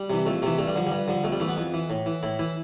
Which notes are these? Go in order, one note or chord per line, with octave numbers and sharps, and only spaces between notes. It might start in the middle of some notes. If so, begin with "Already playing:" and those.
Already playing: G3
C3 E3
F2 A3
C3 E3 A3
G2 A3
G3
D3 F3
G2 G3
D3 F3
F2 A3
G3
E3 A3
B3
F2
E3
A2
E3
A2 E4
E3 E4